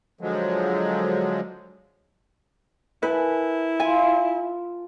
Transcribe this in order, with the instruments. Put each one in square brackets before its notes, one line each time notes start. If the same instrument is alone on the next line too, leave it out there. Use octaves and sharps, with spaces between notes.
[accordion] D3 F3 F#3 G#3
[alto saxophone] E4 [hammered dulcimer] A#4 G#5 A5 [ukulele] B4
[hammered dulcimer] F4 [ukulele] G#5